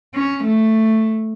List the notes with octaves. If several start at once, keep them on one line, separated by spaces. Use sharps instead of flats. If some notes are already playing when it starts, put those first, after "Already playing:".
C#4
A3